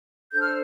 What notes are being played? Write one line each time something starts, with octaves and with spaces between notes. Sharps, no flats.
D4 A4 C5 G6
F6